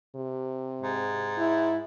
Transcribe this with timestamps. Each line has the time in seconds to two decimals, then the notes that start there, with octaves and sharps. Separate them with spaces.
0.16 C3
0.81 G#2
1.38 E4